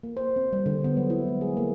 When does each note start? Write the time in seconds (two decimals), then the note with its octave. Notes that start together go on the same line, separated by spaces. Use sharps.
0.03 A#3
0.17 C5
0.36 C4
0.53 G3
0.66 D3
0.84 B3
0.97 F#3
1.10 E4
1.28 G#3
1.41 G#4
1.57 A#3